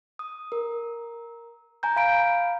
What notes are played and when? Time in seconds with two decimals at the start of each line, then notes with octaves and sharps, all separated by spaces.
0.19 D#6
0.52 A#4
1.83 G#5 A#5 G6
1.96 F5 B5 D7